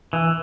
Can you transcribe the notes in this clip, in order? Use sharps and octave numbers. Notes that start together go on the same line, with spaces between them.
E3